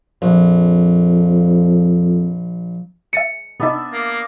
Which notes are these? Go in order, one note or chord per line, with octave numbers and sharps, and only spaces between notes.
A#1 F2
E5 A6 C#7 D#7
C3 B3 D4 D#4 E5
A#3